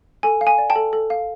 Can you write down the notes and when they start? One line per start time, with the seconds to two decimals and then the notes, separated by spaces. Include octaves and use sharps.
0.23 A4 G#5
0.41 F5
0.47 G#5
0.58 D5
0.70 G5 A5
0.76 A4
0.93 A4
1.10 F5